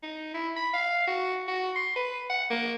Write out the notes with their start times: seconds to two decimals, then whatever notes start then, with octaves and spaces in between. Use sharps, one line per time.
0.03 D#4
0.34 E4
0.56 B5
0.73 F5
1.07 F#4
1.48 F#4
1.76 C6
1.96 B4
2.29 F#5
2.50 A#3